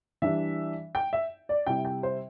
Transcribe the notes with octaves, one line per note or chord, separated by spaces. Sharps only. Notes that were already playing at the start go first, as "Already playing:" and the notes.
E3 G3 D4 E5
G5
E5
D5
C3 G3 E4 G5
G5
C5